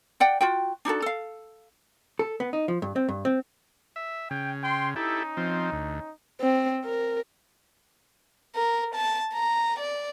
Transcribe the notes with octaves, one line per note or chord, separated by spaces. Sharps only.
D5 F#5 G5
F4 F#4 G5
D4 D#4 F#4 A4
A4 F5
A4
B3
D#4
F3
G2
C4
G2
C4
E5
C#3 G5
G5 C6
C#4 D#4 E4 G4 A4
F3 C4
D2
C4
A#4
A#4
A5
A#5
D5